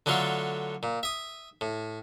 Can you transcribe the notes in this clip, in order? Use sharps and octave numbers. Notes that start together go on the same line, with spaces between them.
D3 F#3 A3 F4 A4
A#2
E5 D#6
A2